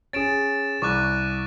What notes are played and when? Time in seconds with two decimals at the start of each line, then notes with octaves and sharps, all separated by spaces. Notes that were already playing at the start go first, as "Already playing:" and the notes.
0.13 C#4 G#4 A6 D7 E7
0.82 C2 C#6 D6 F#6